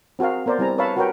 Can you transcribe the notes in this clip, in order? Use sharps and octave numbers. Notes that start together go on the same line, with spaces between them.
C4 F#4 G#4 A#4 F5
B3 A#4 C5 D5
G3 C4 E4 G#5 A#5
B4 C#5 E5 F5 A5 B5
F#4 G4 A#4 B4 C#5 G5